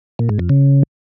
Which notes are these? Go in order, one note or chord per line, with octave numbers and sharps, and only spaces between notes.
A#2
G#2
F2
C#3